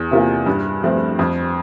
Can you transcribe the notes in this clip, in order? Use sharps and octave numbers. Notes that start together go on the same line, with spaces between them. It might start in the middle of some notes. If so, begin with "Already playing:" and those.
Already playing: E2
C3 E3 A#3 F4
G2
F3 A3 C4
F2